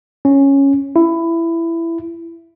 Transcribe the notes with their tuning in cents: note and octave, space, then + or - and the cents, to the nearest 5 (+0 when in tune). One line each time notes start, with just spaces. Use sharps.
C#4 -5
E4 +15